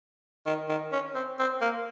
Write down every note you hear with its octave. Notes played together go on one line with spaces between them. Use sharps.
D#3
D#3
C#4
C4
C4
A#3